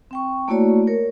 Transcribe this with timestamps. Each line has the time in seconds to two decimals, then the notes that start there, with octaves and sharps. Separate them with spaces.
0.11 C4 G5 C#6
0.48 A3 A#3 E4 F#4 C#5 D5
0.87 A#4 C#5